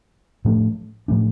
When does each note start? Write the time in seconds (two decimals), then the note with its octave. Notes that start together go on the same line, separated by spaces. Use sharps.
0.45 A2 F3 A3 D4
1.08 A2 F3 A3 D4